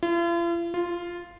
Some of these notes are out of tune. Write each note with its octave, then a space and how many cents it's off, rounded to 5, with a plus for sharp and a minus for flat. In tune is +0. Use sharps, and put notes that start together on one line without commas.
F4 -45
F4 -5